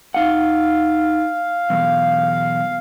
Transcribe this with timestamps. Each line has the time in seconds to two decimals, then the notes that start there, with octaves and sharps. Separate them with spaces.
0.14 D#4 F5 F#5
1.70 B1 E2